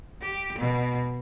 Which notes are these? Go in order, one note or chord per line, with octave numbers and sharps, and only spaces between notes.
G4
B2